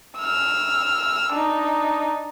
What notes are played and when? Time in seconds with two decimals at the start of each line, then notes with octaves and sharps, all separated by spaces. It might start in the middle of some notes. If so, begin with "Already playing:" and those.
0.18 E6 F6
1.33 D4 D#4